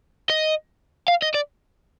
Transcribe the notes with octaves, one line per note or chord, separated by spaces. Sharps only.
D#5
F5
D#5
D5